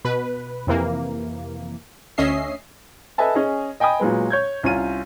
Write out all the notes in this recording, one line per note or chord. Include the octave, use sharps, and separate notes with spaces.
B2 B4
F2 C3 E3 A#3
D2 C#4 D#5 E5 C7
A4 B4 D#5 E5 G#5 A5
C#4 G#4 D#5
D#5 G5 G#5 B5 D#6
A#2 F#3 G#3 B3
C#5 G6 G#6
C2 C#4 F4 C#5 D#7